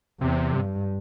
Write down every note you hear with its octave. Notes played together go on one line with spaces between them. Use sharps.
E2 C3
G2